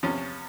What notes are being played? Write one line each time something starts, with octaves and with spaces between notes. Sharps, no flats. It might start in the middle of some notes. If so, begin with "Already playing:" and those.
E2 C3 F3 C#4